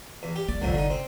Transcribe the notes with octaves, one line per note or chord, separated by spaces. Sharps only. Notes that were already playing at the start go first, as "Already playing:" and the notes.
E2
G4
A#3 D5
G1 C2 F2 A2 D3
D3 D#4
C4